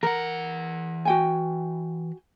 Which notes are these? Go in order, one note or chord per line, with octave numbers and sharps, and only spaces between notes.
E3 A#4 F#5
F#4 G5 G#5